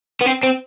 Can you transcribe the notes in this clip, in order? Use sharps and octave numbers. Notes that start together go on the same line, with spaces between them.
B3
C4
C4